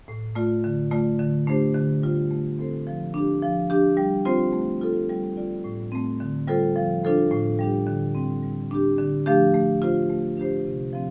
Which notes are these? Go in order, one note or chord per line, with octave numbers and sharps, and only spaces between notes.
A2
A3 F4 D5
D3
A3 F4 D5
D3
A3 D4 G4 C5
D3
G3 F4 C5
A3
C4 A4 C5
F3
D4 G4
F3
D4 G4
G3
C4 F4 C5
A3
F4 A4
G3
F4 D5
A2
A3 C4
D3
G3 F4 A4 C5
F3
D4 F4 A4 C5
A2
G3 D4 G4
D3
G3 C4
G3
D4 G4
D3
F3 A3 D4 G4
A3
F4 C5
A3
D4 G4 C5
C3
F3 C4